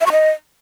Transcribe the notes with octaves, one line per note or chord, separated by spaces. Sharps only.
E5
C#6
D#5